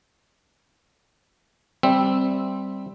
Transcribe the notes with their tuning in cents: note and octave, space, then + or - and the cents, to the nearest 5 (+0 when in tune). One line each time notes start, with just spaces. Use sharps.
G3 +0 C4 +0 E5 +0